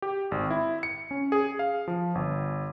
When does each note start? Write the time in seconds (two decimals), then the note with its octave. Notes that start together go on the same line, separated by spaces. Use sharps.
0.02 G4
0.31 G#1
0.51 E4
0.83 C#7
1.11 C#4
1.32 G#4
1.59 F5
1.88 F3
2.15 G1